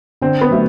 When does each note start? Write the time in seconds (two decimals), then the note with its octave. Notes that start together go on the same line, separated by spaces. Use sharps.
0.22 D3 C4
0.41 B3
0.51 F#3 A3